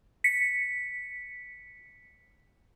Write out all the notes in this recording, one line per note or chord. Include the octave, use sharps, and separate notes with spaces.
B6 C#7